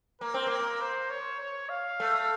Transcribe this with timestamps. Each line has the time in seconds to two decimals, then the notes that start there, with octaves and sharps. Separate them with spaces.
0.21 A#3 A#4
0.34 C4
0.46 A#3
0.81 C5
1.10 C#5
1.40 C#5
1.69 F5
2.00 A3